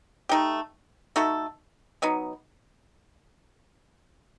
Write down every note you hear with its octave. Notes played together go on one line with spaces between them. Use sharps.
A3 D#4 G4
A3 D#4 F#4 A4
F#3 B3 D#4